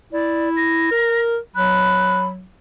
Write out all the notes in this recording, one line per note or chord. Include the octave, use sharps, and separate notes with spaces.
E4 D5
A#6
A#4
F#3 B5 F#6